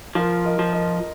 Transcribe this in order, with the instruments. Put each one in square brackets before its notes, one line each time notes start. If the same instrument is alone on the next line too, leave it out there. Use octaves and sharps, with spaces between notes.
[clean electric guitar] F3 [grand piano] F4 A#4
[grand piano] A#4 D#5
[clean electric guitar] F3
[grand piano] A#4 D#5